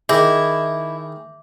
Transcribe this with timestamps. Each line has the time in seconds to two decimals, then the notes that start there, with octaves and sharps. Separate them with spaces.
0.09 D#3 E4 G#4 D6 G6 A#6